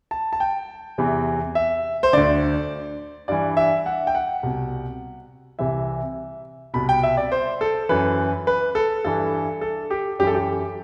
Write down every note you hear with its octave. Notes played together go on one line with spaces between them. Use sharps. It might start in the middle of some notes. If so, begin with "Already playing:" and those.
A5
A5
G5
E2 C3 E3
E5
C5
D2 D3 D5
G2 E3 D5
E5
F#5
G5
F#5
C2 B2
C2 C3 E3 E5
C2 B2 B5
G5
E5
D5
C5
A4
F#2 E3 B4
B4
A4
G2 E3 A4
A4
G4
F#2 E3 G4 A4
G4